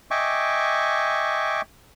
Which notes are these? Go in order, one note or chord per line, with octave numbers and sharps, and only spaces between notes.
D#5 E5 G5 G#5 C#6 D6